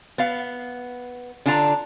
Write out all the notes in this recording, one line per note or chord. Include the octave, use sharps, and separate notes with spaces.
B3 F5
D3 D4 F4 A5 A#5